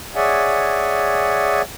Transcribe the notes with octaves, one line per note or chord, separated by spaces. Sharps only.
G#4 C#5 D5 E5 F#5 G#5